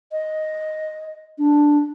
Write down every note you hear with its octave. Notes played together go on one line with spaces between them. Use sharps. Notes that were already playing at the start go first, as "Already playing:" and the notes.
D#5
D4